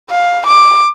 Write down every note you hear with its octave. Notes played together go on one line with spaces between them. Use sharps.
F5
D6